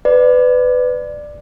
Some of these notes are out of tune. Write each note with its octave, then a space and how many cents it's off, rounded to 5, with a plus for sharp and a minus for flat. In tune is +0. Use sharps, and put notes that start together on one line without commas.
B4 +25 D5 +10